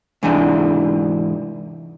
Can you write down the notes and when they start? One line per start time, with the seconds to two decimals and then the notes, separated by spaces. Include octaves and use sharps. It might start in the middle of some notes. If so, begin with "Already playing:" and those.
0.23 G#2 C3 E3 D4 D#5